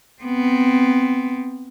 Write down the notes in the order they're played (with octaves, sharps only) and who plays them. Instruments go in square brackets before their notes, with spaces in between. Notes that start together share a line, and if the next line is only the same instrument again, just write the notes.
[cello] B3 C4